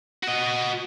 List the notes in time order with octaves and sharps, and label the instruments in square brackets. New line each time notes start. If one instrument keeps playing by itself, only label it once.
[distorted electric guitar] F#4 D#5